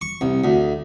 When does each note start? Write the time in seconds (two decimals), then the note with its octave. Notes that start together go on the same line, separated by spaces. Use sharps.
0.01 C#6
0.21 C2
0.44 D2